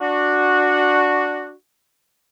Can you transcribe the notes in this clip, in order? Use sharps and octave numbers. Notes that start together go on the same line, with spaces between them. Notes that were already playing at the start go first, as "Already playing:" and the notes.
D4 F#4